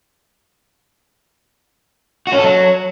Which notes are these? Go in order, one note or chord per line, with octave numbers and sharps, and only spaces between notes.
F#4
C#4
A4
F#3